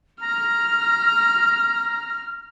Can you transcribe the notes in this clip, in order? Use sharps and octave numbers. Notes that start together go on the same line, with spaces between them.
A#5 F6